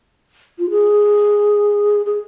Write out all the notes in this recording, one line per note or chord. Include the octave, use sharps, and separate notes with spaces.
F4
G#4
G#4